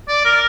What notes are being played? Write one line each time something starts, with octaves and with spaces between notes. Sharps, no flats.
D5
A#4